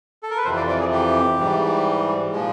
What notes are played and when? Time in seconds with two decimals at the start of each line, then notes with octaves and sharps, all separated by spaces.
0.23 A4
0.30 A#4
0.37 B4
0.45 F2 C3 E3 C5
0.56 D5
0.69 D5
0.80 G#4
0.92 G4
1.39 G#2 E3 G3
2.32 A#2 F3 G#3